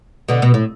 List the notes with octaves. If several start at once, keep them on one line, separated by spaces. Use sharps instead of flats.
B2 D3
B2
A2